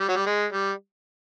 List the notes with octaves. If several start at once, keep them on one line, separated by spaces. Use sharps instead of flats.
G3
F#3
G3
G#3
G3